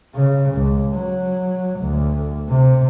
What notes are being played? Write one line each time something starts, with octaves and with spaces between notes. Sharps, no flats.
C#3
C#2
F#3
D2
C3